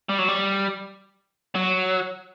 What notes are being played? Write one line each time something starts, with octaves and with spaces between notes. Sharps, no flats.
G3
F#3
G3
F#3